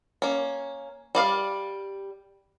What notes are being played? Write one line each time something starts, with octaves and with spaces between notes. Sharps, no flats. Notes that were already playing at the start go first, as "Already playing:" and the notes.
A#3 C#4
G3 D5 F5